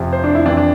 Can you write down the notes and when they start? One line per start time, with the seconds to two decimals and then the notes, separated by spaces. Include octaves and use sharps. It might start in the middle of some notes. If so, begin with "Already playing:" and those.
Already playing: F2 C3 F3
0.13 C5
0.24 D4
0.35 E4
0.45 F2 E3 D4
0.57 D4